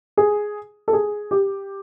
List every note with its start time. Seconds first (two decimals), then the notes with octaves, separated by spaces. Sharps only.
0.17 G#4
0.88 A4
0.93 G#4
1.31 G4